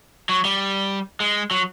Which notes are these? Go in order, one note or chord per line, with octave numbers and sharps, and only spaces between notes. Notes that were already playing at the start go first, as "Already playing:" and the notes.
F#3
G3
G#3
F#3